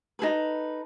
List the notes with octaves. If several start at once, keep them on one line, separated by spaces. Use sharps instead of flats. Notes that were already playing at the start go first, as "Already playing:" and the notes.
D#4 G#4 A4 B4